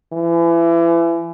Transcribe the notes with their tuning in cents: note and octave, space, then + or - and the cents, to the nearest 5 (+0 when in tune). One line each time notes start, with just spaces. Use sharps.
E3 +30